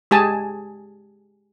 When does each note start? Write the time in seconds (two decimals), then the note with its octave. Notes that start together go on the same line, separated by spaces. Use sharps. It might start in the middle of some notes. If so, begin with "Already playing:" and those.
0.11 G#3 G4 G#4 G#5 A5